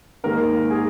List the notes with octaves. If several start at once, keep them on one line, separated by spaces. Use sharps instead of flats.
G#2 D#3 G#3 A#3 A#4
G#4 G#5